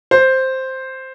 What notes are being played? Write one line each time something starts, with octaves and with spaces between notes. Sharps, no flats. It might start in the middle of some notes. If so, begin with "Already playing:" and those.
C5